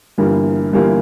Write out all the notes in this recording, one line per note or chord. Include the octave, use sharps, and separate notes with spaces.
G1 G2 E3 G3 A#3
G1 G2 E3 G3 A#3